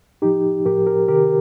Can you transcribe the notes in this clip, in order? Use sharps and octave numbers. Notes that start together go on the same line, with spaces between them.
A2 F3 D#4 G4
A2 F3 G4 A#4
G4 A#4
C3 D#3 G4 A#4